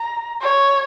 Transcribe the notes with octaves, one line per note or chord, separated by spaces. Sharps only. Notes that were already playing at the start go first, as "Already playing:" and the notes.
Already playing: A#5
C#5